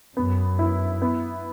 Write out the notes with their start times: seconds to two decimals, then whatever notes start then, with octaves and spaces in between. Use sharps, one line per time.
0.17 F#2 B3
0.59 E4
1.02 B3